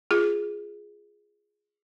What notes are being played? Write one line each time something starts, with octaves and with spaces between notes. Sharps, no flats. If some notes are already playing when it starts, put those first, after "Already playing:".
F4 G#4